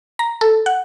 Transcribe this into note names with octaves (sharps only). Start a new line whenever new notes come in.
A#5
A4
F#5